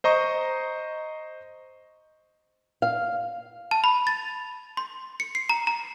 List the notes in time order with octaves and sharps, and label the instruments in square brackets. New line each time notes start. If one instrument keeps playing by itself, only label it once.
[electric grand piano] C5 D#5 A#5 C#6
[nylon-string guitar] F5
[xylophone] A5
B5
A6
C6
C#7
C7
A#5
A#5